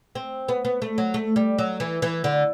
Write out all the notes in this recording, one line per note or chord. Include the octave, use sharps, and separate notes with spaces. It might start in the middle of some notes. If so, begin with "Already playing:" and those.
C4
B3
B3
A3
F#3
A3
G3
F#3
E3
E3
D3